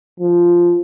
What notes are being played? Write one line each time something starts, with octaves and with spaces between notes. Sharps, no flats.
F3